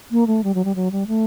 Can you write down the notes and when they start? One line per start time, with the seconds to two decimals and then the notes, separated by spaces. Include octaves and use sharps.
0.11 A#3
0.27 A3
0.44 G3
0.54 F#3
0.65 G3
0.75 F#3
0.91 G3
1.07 A3